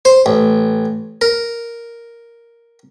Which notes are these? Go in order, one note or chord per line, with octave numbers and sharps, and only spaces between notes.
C5
A1
A#4